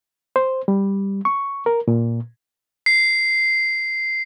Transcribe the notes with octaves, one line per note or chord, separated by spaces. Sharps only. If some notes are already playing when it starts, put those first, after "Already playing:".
C5
G3
C#6
A#4
A#2
C7